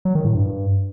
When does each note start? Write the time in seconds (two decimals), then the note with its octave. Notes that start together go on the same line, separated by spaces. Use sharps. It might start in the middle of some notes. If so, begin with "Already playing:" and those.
0.05 F#3
0.15 D#3
0.25 A2
0.35 G2